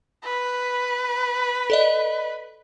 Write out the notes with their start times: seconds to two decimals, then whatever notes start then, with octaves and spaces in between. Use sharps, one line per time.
0.24 B4
1.70 A4 D5 D#5